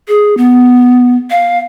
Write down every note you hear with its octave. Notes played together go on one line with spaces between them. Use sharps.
G#4
B3
F5